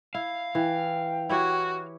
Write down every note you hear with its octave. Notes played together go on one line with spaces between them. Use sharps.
E4 F5
E3 G5
E4 F#4 G4 C#5